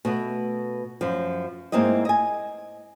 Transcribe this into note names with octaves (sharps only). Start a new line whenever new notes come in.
B2 A3 B3
F#2 F3
G#2 A#3 C4 E4 D#5
D#5 G#5